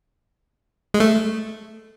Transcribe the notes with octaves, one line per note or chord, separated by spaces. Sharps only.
G#3
A3